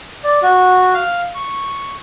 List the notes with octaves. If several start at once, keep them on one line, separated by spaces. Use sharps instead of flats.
D5
F#4
F5
C#6